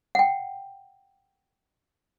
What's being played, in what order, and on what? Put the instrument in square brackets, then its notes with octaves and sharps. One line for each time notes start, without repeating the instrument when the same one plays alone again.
[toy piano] F#5 G5